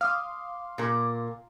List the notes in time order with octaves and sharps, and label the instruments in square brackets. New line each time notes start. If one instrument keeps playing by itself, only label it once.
[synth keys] F5 C6 [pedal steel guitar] D6 D#6 F6
[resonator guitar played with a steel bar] A#2 A#4